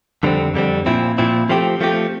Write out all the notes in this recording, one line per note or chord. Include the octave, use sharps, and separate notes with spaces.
F2 D3 G3 C4
F2 D3 G3 C4
A#2 F3 C4 E4
A#2 F3 C4 E4
F3 A3 C4 G4
F3 A3 C4 G4